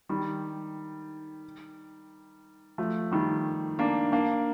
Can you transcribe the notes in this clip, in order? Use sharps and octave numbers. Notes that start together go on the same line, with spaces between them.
D#3 G3
F3 A3
D#3 G3
A#3 D4
A#3 D4